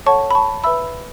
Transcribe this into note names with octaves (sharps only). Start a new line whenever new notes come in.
A4 C#5 F#5 A5 C#6
B5
A5 C#6
B4 E5 B5 E6